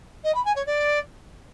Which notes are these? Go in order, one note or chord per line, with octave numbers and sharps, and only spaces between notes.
D#5
B5
G#5
C#5
D5